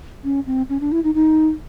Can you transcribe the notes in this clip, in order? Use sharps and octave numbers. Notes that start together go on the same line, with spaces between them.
C#4
C4
C#4
D4
E4
D#4
D#4